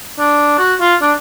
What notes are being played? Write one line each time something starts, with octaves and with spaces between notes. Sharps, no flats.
D4
F#4
F4
D4